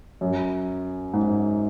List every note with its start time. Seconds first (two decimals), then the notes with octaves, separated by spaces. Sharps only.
0.21 F#2
1.13 G#2